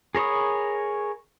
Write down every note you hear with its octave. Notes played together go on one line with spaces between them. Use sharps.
G#4 A#4 C#5 B5 D#6